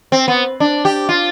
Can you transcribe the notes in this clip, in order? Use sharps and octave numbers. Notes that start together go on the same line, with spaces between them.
C4
B3
D4
G4
F4